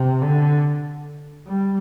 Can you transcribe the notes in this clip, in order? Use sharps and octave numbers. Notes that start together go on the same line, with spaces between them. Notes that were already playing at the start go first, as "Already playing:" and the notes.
Already playing: C3
D3
G3